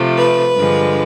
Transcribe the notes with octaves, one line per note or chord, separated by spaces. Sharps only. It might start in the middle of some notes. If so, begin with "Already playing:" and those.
Already playing: C3 F3 A3
B4
G2 D3 F3 G#3